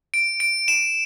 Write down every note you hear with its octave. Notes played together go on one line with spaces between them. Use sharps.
D7
D7
E7